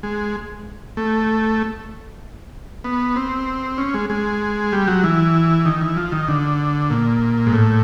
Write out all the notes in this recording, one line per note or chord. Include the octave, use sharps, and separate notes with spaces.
G#3
A3
B3
C4
C#4
G#3
G#3
G3
F#3
E3
D#3
E3
F3
D#3
D3
A#2
G#2
A2